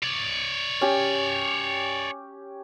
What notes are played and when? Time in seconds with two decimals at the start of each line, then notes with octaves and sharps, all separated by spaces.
0.03 C#5 D5
0.81 C#4 G4